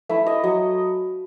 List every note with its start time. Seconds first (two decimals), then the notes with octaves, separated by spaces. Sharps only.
0.09 A3 E4 E5
0.27 D#5
0.44 F#3 D#5